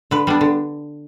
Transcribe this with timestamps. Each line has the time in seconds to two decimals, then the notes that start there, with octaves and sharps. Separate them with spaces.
0.11 D3 B4
0.27 G3 B3 D4
0.41 D3